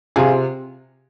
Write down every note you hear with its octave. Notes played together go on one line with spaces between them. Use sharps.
C3 F4 G#4